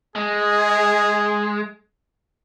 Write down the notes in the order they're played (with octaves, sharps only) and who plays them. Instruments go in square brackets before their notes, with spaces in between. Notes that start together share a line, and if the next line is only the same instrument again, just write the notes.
[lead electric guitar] G#3 [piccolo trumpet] G#4